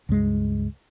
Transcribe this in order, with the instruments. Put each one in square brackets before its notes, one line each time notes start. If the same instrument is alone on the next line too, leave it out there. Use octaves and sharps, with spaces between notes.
[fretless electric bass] C#2 G2 G#3